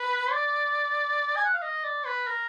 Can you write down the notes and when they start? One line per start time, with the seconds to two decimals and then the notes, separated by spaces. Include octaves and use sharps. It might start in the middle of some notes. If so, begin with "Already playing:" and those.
Already playing: B4
0.31 D5
1.36 G#5
1.45 F#5
1.54 F5
1.62 D#5
1.84 D5
2.06 B4
2.27 A#4